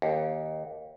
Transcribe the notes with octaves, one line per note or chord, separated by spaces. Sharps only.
D#2